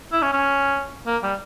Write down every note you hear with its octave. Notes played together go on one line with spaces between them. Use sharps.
E4
C#4
C#4
A#3
G3